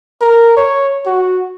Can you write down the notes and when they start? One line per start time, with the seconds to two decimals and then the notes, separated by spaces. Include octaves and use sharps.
0.21 A#4
0.56 C#5
1.06 F#4